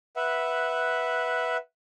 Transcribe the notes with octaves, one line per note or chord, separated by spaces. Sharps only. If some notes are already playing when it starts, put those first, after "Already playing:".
B4 E5 F#5